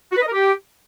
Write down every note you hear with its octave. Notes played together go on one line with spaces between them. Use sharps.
F#4
B4
D#5
A#4
G4